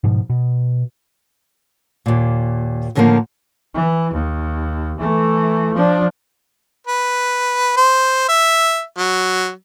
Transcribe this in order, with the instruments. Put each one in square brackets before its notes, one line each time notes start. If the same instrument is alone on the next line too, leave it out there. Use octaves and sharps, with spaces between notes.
[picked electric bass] G#2 B2 F3
B2
[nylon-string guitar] D#2 A#2
A2 D3 D#3 F3 A3 A#3
[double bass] E3
D#2
E3 A3
F3 D4
[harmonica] B4
C5
E5
F#3